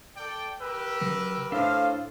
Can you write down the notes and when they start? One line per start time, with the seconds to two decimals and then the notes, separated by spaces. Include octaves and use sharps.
0.16 A4 D5 G5
0.61 G4 A#4 B4 E6
1.01 C#3 F#3
1.52 A2 D4 A4 C5 E5 F5